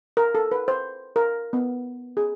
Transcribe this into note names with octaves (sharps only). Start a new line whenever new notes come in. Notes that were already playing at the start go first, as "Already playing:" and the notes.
A#4
A4
B4
C5
A#4
B3
G#4